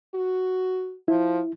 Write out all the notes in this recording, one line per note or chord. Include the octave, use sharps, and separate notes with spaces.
F#4
F3 E4